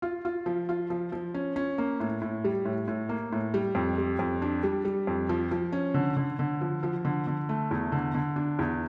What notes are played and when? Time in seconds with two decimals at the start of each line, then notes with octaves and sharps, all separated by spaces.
0.02 F4
0.25 F4
0.46 F3
0.69 F4
0.90 F3
1.12 F3
1.34 C#4
1.56 C#4
1.78 A#3
2.00 A2
2.21 A2
2.44 G3
2.65 A2
2.88 A2
3.09 A#3
3.32 A2
3.54 G3
3.75 F2
3.98 G3
4.19 F2
4.42 D4
4.63 G3
4.85 G3
5.07 F2
5.29 F3
5.51 F3
5.72 C#4
5.94 D3
6.17 D3
6.39 D3
6.61 F3
6.83 F3
7.05 D3
7.27 D3
7.49 A3
7.71 E2
7.92 D3
8.15 D3
8.36 D4
8.59 E2